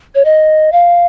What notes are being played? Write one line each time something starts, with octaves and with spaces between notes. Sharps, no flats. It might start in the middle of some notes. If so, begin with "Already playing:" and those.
C#5
D#5
F5